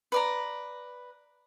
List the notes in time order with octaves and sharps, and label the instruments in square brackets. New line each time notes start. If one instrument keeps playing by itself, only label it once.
[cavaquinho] B4 D5 A#5